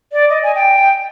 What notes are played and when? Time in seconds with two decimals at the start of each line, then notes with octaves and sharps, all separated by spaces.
0.13 D5
0.30 D#5
0.43 G#5
0.55 G5